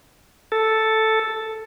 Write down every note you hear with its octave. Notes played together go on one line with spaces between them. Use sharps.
A4